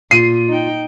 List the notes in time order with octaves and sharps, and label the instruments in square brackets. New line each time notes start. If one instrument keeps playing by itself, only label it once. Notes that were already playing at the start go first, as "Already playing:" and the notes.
[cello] A#2 [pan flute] F4 [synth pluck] C7 [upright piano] D#7
[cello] D#4 G5